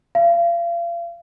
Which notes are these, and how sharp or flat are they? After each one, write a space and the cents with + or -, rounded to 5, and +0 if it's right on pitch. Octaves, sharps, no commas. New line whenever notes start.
F5 -35